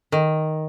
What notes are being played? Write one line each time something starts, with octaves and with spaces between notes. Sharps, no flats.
D#3